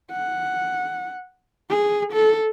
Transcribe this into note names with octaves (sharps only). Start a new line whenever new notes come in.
F#5
G#4
A4